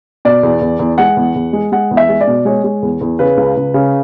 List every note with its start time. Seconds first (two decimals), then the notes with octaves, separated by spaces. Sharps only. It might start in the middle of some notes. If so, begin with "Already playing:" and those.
0.25 B2 D5
0.43 E2
0.61 E2
0.79 E2
0.98 G#3 F#5
1.17 E2
1.35 E2
1.53 G#3
1.72 G#3 F#5
1.91 E2
1.97 E5
2.09 G#3
2.21 D5
2.27 B2
2.45 G#3 C#5
2.64 G#3
2.82 E2
3.01 E2
3.19 C#3 B4
3.37 C#2
3.57 C#2
3.74 C#3